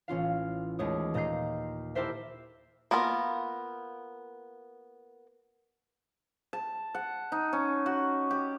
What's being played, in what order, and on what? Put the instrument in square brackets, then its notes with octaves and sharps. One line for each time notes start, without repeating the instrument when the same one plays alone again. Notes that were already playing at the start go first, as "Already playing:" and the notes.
[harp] A1 C#4 F4 F5
D#2 G#3 A3 C#5 D#6
A#2 D#5 A#5 G6 C7
E4 G4 A4 A#4 C5 E5
[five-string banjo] A#3 B3 F4 A4 A#4
[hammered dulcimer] A5
F#5
D#4
C#4
F#4
G4